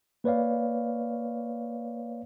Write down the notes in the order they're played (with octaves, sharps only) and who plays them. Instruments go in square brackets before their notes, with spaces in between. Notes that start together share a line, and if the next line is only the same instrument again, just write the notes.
[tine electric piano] A#3 B4 C#5 D5 F5